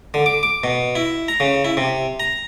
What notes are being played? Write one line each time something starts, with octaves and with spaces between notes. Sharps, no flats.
D3
D6
D6
B2
E4
A#5
C#3
E4
C3
A#5